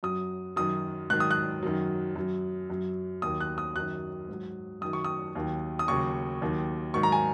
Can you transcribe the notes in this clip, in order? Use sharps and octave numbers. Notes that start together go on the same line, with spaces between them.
F#2 F#3 D#6
F#2 D#3 F#3 D#6
G#2 D#3 F#3 F#6
D#6
F#6
F#2 D#3 F#3
F#2 F#3
F#2 F#3
D#2 D#3 F#3 D#6
F#6
D#6
F#2 D#3 F#3 F#6
G#2 F#3
F#2 D#3 F#3 D#6
C#6
D#6
D#2 D#3 F#3
D#6
D#2 C#3 F#3 C#6
D#2 D#3 F#3
G#2 D#3 F#3 C#6
A#5
G#5